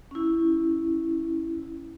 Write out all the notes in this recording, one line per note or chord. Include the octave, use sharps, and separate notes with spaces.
C#4 E4